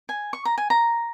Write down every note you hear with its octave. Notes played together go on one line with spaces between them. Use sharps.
G#5
C#6
A#5
G#5
A#5